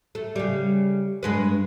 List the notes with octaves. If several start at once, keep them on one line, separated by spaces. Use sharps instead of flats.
A3
C#3 G3
G2 G#3 B4